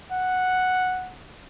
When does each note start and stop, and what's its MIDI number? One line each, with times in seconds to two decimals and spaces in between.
0.12 1.13 78